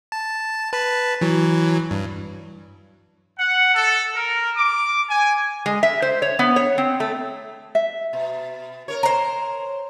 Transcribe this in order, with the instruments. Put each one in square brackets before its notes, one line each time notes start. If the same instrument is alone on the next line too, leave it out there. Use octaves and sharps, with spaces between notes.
[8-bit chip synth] A5
B4 A5 B5
E3 F#3
G2
[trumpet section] F#5
A4
A#4
D6
G#5
[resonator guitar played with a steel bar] G#3
E5
C5
C#5
B3
C#5
C4
A3
[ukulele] E5
[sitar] B2
A#4 C#5
[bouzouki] C5 A#5